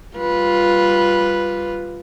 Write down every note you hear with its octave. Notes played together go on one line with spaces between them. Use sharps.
G3 F4 B4